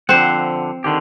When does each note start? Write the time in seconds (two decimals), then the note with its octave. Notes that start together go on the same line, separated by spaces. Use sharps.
0.09 D3 F3 C4 C5 F#5
0.84 D3 D#3 G4